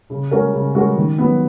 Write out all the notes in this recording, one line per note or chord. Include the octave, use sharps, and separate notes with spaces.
C#3
G#3 C#4 F#4 A#4
C#3
G#3 C#4 F#4 A#4
D#3
F#3 B3